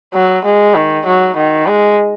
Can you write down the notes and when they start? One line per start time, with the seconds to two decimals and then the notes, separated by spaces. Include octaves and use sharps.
0.14 F#3
0.45 G#3
0.75 D#3
1.06 F#3
1.37 D#3
1.67 G#3